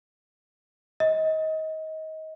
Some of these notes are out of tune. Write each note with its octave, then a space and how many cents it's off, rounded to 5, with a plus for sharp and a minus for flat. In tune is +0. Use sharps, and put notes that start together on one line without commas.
D#5 +25